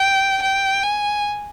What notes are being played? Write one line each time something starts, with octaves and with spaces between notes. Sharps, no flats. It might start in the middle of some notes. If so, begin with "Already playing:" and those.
Already playing: G5
G5
G#5